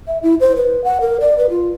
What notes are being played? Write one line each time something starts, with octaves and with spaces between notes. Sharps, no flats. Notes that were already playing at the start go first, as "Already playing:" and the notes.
E5
E4
C5
B4
F#5
A#4
D5
B4
F4